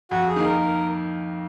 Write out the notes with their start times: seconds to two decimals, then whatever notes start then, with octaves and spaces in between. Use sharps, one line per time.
0.11 F2 F#4
0.28 G#4
0.36 D#3 A#3
0.44 A#4
0.61 A#4